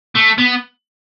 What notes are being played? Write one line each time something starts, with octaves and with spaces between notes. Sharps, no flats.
A3
B3